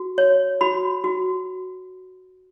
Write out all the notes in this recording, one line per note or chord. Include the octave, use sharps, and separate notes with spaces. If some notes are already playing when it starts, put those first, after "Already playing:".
Already playing: F#4
C#5
F#4 B5
F#4